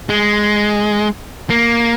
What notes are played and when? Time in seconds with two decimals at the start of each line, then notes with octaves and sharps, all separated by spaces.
0.09 G#3
1.50 A#3